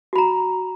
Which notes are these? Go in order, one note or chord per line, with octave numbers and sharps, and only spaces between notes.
F#4 A#5 B5